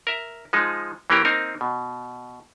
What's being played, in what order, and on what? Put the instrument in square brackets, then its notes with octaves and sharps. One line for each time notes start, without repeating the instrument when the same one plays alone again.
[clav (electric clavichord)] A#4 E5
F3 G#3 D#4
E3 A#3 C#4 G4 A#4
A#3 C4 D#4 A#4
B2